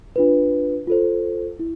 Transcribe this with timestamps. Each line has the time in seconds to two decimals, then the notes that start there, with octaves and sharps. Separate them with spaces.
0.16 D4 F4 B4
0.87 F4 A4 C5
1.59 E4